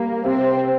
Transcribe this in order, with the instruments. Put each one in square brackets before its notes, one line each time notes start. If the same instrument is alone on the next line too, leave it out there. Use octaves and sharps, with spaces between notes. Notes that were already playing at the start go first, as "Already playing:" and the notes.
Already playing: [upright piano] G3 [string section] A#3
[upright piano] C3 [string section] C4